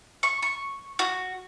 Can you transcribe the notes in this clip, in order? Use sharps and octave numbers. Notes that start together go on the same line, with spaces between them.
C#6
C#6
F#4